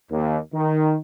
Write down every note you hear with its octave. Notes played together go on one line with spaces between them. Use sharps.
D#2
D#3